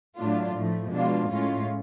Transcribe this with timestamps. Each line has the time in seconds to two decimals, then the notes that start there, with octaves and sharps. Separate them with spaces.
0.17 A2 F#3 A3 D4 F4
0.55 A2 F3 A3
0.93 B2 G#3 D4 F4
1.30 A2 G#3 C#4 F4